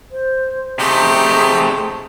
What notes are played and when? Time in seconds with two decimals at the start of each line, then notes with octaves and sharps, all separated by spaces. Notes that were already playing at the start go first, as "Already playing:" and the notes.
0.11 C5
0.79 C3 A3 D#4 G4 G#4